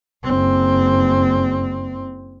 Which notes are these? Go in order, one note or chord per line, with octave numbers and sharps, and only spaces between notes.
F#1 C4